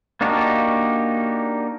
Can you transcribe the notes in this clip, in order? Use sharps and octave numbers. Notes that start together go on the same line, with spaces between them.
A#3 D4 D#4 F#4 G4